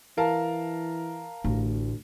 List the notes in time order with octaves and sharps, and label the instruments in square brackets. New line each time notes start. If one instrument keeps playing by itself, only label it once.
[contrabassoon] E3 [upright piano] A#4 F5 A5
[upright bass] A1 [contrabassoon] D2